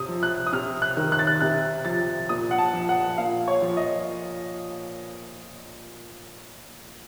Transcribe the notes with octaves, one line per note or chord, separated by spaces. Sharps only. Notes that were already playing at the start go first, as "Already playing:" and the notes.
Already playing: C3 D#6
F3
F#6
D#6
C3 F6
F#6
D#3
F#6
A6
F#6
C3 F#6
F3 A6
A#2 D#6
F#5
A5
F3
F#5
A#2 F5
C#5
F3
D#5